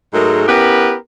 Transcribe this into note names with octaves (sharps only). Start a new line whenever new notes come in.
G#2 F#3 G#3 A3 A#4
B3 C#4 E4 G4 A#4 B4